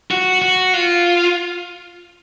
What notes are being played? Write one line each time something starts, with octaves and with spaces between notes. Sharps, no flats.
F#4
F#4
F4